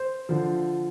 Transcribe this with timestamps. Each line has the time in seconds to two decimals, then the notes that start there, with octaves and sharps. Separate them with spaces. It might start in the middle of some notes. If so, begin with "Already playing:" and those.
Already playing: C5
0.29 D3 F3